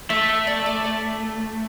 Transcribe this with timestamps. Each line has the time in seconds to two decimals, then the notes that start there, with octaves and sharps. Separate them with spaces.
0.10 A3 E5
0.29 E5
0.47 D5
0.59 E5
0.66 D5
0.84 D5